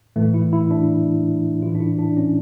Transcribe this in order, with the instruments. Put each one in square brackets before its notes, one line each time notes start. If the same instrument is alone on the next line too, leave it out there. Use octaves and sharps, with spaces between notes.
[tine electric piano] A2 E3 A3
E4
E4
D4
A2 F4
E3
D4
E4
D4
C#4